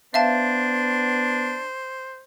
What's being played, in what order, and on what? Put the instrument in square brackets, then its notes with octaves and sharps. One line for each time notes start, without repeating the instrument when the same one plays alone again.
[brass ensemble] B3 [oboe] D4 [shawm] C5 [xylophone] E5 F5 A5